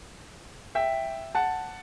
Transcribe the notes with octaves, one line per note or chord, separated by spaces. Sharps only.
E5 G5
F#5 A5